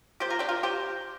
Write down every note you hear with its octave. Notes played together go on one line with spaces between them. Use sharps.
F3 A#3 G4 C5
F4 A#4
D4 G4
F4 A#4
G4 C5